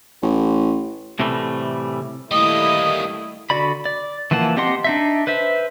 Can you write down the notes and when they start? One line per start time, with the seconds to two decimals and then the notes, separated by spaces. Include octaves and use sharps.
0.22 A1
1.19 A2 C3 E3 G3 A3
2.31 G3 A3 A#3 E4 D#5 D#6
3.50 D3 F#4 D5 B5
3.85 D5
4.31 E3 F3 A#3 F#5 A5
4.57 C4 G4 D#5 F#5 C6
4.84 D4 D#4 E5
5.27 B4 C5 E5